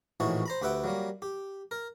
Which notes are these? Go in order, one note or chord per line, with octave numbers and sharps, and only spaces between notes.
A#1 A2 E3 D#4 F#4 C#5
C5 A#5 B5
D2 G4 B4 E5 F#5 G5
F#3 G3 A#3
G4
A#4